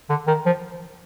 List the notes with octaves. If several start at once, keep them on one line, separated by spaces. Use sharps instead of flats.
D3
D#3
F3